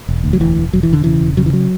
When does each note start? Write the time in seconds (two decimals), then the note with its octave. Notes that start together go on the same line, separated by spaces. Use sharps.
0.09 E1
0.24 D2
0.33 F#3
0.40 E1 E3
0.57 E1
0.73 E1 F#3
0.83 E3
0.89 E1 D3
1.04 C#3 E3
1.21 E1
1.37 C#3 F#3
1.46 E3
1.53 F#3